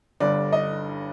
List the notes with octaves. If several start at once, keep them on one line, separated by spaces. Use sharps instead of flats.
G1 G2 D3 D5
D#5